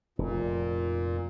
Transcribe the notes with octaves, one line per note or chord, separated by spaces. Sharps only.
F1 A#2